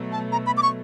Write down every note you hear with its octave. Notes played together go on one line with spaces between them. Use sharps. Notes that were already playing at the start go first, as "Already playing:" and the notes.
Already playing: B2 F#3 A3
A5
A#5
B5
D6
C#6